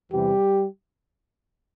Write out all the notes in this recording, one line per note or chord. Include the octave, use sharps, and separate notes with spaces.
E2 C3 E3 G3 G4